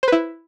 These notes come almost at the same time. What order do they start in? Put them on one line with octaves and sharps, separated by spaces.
C5 B4 E4